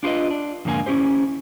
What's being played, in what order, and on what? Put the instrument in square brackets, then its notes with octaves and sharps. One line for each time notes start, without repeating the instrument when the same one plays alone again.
[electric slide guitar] D4 F4 G4 B4 D#5
D4
F2 G#2 D3 A#3 G#5
C#4 E4 G4 C5